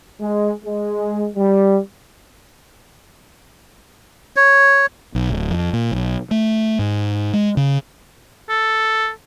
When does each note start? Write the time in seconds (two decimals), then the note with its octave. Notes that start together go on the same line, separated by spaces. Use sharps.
0.20 G#3
0.65 G#3
1.36 G3
4.36 C#5
5.15 B1
5.30 D1
5.50 F2
5.73 A#2
5.92 B1
6.31 A3
6.79 G#2
7.33 G#3
7.57 C#3
8.49 A4